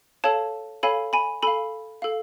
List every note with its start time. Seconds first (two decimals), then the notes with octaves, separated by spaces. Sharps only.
0.24 A4 C#5 F5 A5
0.83 A4 C#5 F5 G#5 B5
1.13 G#5 B5
1.43 A4 F5 G#5 B5
2.02 A4 F5